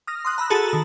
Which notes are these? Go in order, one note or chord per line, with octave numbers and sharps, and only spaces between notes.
D#6 F6 A#6
C6 D#6 F#6
A#5 B5 E6 F#6
F#4 G#4 A4 A5 B5 A6
D#3 A#5